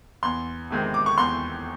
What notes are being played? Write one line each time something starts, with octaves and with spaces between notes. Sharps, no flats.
E2 C6
C3 D#3 G#3 C4
D6
C#6
E2 C6